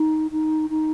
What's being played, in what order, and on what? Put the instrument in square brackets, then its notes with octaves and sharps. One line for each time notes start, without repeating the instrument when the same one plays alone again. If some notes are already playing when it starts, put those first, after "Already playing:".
Already playing: [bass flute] D#4
D#4
D#4